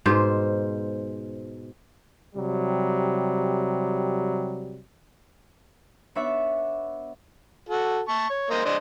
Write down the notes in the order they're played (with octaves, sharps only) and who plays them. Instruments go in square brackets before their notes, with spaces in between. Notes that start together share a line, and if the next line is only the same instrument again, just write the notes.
[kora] G#2 B2 C5
[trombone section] C3 F#3 G3
[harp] B3 D4 C#5 E5
[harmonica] F#4 A4
A5 C#6
C#5
A#3 C5 D#5
D4 C5 D#5